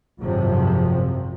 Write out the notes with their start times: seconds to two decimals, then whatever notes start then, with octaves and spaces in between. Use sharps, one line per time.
0.19 G#1 F#2 C3 F3